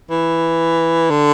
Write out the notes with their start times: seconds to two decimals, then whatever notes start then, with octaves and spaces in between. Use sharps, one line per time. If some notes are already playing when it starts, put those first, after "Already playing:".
0.10 E3
1.10 D3